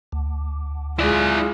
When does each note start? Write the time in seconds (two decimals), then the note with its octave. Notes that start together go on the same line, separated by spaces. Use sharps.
0.12 D2
0.99 G#3 E4 F4 D5